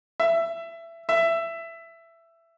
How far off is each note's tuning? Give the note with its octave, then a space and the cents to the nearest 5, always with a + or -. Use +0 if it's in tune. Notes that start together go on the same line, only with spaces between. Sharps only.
E5 +20
E5 +15